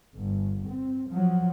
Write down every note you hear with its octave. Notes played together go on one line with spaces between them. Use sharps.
G1
C4
F3 F#3